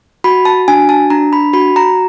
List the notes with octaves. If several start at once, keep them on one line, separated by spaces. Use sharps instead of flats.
F#4 B5
A5
D4 G#5
A5
D4 A#5
B5
F#4 B5
A#5